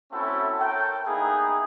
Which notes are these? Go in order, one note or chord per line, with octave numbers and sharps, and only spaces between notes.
A3 C4 C#4 E4 F#4 A4
A4 A#4 C#5 G5
A#3 B3 D#4 E4 G#4